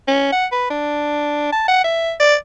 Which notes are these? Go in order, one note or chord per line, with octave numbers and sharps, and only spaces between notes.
C#4
F#5
B4
D4
A5
F#5
E5
D5